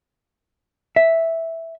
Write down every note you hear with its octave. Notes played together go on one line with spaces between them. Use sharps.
E5